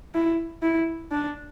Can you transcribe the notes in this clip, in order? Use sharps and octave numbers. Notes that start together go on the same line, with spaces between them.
E4
E4
D4